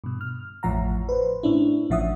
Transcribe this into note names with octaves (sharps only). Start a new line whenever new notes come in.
G2 B2
F6
A1 F2 A2 F3 F#5 A#5
B4 C5
A2 C#4 D4 E4
A1 A2 F3 E5 F#5 D#6